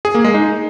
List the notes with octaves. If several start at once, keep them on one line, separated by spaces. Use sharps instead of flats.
G#4
A#3
G#3
D#4